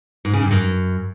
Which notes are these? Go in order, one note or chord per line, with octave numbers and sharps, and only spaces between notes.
G#2
C#3
G2
F#2